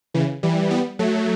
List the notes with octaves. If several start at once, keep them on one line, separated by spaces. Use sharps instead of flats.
C#3 E3
E3 G3
G3 B3
F#3 A3